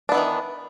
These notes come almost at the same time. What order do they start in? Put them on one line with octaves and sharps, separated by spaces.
D4 B3 E3 D#3